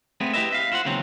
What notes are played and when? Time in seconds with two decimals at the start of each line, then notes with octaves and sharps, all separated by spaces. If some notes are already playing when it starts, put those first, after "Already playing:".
0.20 A3 B3 C4 G#4
0.34 E4 G4 G#4 B4 D#5 E5
0.52 E5 F5
0.72 E4 F4 C5 F#5
0.85 D#2 C#3 E3 F#3 C4